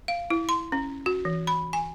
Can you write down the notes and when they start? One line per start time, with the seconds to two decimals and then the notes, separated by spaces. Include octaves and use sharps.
0.08 F5
0.30 E4
0.49 C6
0.72 C#4
1.06 F#4
1.25 E3
1.47 B5
1.73 G#5